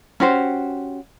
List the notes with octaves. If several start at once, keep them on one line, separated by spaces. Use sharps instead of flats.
C#4 F#4 G4 C5